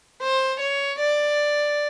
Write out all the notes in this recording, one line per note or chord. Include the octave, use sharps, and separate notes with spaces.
C5
C#5
D5